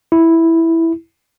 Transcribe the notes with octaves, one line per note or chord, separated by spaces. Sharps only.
E4